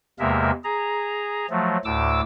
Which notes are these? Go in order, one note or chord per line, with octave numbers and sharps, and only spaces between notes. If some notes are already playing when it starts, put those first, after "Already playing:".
E2 C3 G#3 A#3 A#4 E5
G#4 A#5
F3 F#3 A3
D2 A2 D6 E6